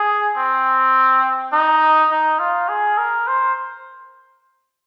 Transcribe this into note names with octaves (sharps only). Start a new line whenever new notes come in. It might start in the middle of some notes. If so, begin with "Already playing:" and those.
Already playing: G#4
C4
D#4
D#4
F4
G#4
A#4
C5